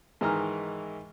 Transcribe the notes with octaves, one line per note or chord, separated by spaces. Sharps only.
G#2 D#3 E3 D#5 A#5 F6